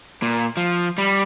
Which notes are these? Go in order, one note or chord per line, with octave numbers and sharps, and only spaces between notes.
A#2
F3
G3